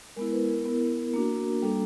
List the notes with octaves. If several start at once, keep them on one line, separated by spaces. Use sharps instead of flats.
G#3 B3 E4 A#4
B4
A#4
B3 E4
A#3 D4 F#4
G3 A#3 D4 A4